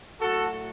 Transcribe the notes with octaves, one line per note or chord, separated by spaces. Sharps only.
A2 F#3 A3 F#4 A4